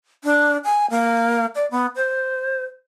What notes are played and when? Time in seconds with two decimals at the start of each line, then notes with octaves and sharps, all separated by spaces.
0.24 D4
0.65 G#5
0.90 A#3
1.55 D5
1.71 B3
1.96 C5